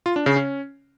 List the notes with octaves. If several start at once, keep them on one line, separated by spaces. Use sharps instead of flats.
F4
D4
C#3
C#4